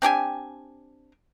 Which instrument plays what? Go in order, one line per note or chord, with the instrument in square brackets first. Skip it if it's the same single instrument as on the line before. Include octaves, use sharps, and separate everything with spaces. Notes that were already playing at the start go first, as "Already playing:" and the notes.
[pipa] C4 D4 G4 G#5